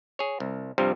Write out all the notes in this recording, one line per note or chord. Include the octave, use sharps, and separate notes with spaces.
G#4 C#5
C2
G2 C3 F3 G3